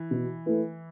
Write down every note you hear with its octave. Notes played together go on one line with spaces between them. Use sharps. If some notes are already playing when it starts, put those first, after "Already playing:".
Already playing: E3
B2
A3 E4 B4